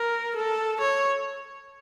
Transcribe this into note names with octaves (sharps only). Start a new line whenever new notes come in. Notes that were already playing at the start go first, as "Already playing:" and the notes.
Already playing: A#4
A4
C#5